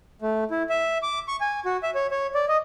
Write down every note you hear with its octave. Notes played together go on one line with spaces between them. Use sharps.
A3
E4
E5
D6
C#6
G#5
F#4
E5
C#5
C#5
D5
D#5